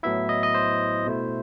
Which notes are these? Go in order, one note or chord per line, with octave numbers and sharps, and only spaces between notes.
A2 F#3 B3 E4 E5
D#5
D#5
C5
B2 A3 E4